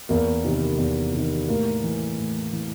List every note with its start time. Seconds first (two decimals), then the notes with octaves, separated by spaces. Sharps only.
0.09 E2 A#3
0.44 C3 D#3
0.78 E2
1.13 C3 D#3
1.48 A2 A#3
1.83 E3
2.18 A2
2.53 E3